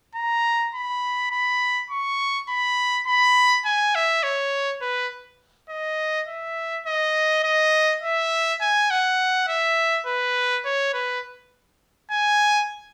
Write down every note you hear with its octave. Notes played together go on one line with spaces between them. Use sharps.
A#5
B5
B5
C#6
B5
B5
G#5
E5
C#5
B4
D#5
E5
D#5
D#5
E5
G#5
F#5
E5
B4
C#5
B4
G#5